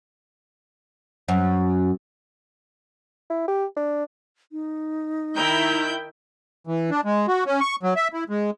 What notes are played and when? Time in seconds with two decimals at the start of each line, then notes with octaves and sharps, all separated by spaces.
1.28 F#2
3.30 E4
3.48 G4
3.77 D4
4.52 D#4
5.36 D#3 E4 G5 A#5 G6
6.67 E3
6.91 D4
7.05 G#3
7.28 F#4
7.46 C#4
7.61 C#6
7.83 F#3
7.96 E5
8.13 E4
8.29 G#3